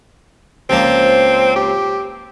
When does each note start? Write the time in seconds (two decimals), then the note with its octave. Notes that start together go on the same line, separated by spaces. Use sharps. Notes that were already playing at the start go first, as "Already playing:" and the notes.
0.70 C#2 F3 A#3 C4
1.56 G4